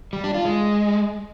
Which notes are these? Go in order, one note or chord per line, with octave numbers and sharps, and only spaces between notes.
G3
D4
F4
G#3